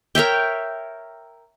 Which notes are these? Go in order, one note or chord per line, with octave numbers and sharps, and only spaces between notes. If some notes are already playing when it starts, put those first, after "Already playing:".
A#4 C#5 E5 G5